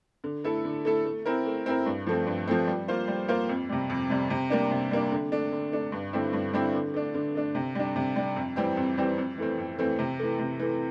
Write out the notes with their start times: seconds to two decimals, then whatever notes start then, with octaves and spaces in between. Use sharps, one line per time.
0.24 D3
0.44 A3 E4 A4
0.65 D3
0.85 A3 E4 A4
1.05 A3
1.25 C4 E4 A#4
1.46 A3
1.66 C4 E4 A#4
1.86 G2
2.06 F3 A3 C4
2.27 G2
2.47 F3 A3 C4
2.67 G3
2.88 A#3 F4 C5
3.08 G3
3.28 A#3 F4 C5
3.49 F2
3.69 C3 G3
3.90 F2
4.10 C3 G3
4.30 C3
4.50 G3 A#3 D4
4.71 C3
4.91 G3 A#3 D4
5.12 D3
5.32 A3 D4
5.52 D3
5.72 A3 D4
5.92 G2
6.13 D3 G3 C4 E4
6.33 G2
6.53 D3 G3 C4 E4
6.74 D3
6.94 A3 D4
7.14 D3
7.35 A3 D4
7.55 C3
7.75 G3 D4
7.96 C3
8.16 G3 D4
8.36 F2
8.56 E3 G3 C4 G4
8.77 F2
8.97 E3 G3 C4 G4
9.18 F2
9.38 E3 A3 C4
9.58 F2
9.78 E3 A3 C4
9.99 C3
10.19 E3 A3
10.39 C3
10.59 E3 A3